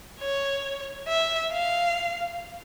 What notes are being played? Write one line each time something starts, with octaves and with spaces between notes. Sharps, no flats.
C#5
E5
F5